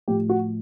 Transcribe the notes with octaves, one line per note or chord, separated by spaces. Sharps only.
A2 F3 G4
F#4